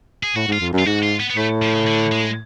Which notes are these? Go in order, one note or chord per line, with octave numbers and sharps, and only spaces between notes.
G#4
A2 F#4
G#2
F4
F2
F#2
F4
G#2 F#4
F4
B3
B3
A2 A3
F3
C#3
D3
G#3